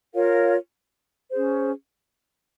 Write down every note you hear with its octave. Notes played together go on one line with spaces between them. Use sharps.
F4 A#4 C#5 F5
C#4 G#4 C5